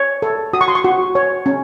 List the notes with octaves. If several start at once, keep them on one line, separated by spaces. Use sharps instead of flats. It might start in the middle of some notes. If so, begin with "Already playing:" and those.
Already playing: C#5
A4
F#4 D#6
C#6
C6
C#6
F#4
C#5
C#4